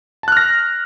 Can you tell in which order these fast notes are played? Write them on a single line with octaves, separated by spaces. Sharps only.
A5 F#6 F6 A#6